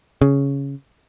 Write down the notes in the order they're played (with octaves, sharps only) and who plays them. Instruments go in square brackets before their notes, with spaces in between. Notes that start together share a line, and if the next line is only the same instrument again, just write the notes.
[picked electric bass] C#3